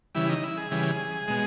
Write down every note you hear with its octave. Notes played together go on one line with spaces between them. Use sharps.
C#3 E3 G3 E4
D#4
E4
G#4
C#3 E3 G3
B2 G#3